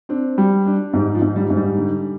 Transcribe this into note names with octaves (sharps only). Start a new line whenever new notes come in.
C4 D4
G3
D4
G#2 G3
F3
G#2
G3
G#2
G3
D3